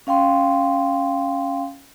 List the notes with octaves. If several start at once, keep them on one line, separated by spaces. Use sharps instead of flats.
C#4 F5 G5 C6